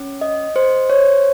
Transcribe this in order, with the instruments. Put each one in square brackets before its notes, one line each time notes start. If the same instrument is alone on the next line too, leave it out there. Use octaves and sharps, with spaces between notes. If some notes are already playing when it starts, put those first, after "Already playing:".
Already playing: [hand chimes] C#4
D#5
C5
C#5